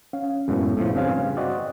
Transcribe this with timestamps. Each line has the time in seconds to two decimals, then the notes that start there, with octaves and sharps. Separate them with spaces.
0.13 C#4 F5
0.48 F#2 A2 C3 G#3 B3
0.77 A2 F3
0.95 G2 C#3 C4 C#4 F5
1.37 C4 F#4 D5 D#5